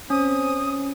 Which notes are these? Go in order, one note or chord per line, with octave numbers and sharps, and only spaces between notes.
C4 C#4 D#6